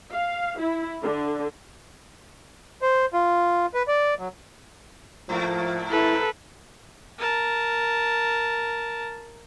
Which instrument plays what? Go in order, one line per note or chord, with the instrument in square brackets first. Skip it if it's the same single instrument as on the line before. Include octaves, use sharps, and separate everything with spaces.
[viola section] F5
E4
D3
[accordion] C5
F4
B4
D5
F#3
[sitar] G#2 A3 A#3 [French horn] F3
[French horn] E4 [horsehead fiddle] A4 [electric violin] B4
[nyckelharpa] A#4 A5